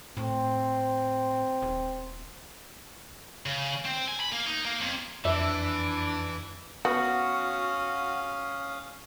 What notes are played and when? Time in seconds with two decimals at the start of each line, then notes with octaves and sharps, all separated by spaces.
0.17 A2 C4
1.62 D#1
3.46 C#3
3.85 C4
4.08 G#5
4.20 B5
4.32 A#3
4.47 D#4
4.65 A#3
4.81 F2
5.25 F2 E3 D4 E5 D6
6.85 B3 C#4 F#4 F5 D#6